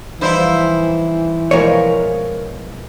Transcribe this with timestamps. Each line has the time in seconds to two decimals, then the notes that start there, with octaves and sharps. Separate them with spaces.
0.21 E3 F3 G3 D#4 E4 C5 E5
1.51 B2 F3 G#3 A#4 C#5